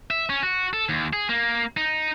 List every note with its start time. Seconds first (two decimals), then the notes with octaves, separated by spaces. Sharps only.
0.10 E5
0.29 C#4
0.43 F#4
0.73 A4
0.89 D#2
1.13 G#4
1.29 A#3
1.77 D#4